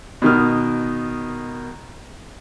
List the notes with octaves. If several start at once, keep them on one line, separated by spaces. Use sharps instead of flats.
B2 D#3 F6